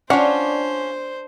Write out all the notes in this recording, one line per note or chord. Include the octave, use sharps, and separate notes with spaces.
C#4 D4 F4 C5 F#5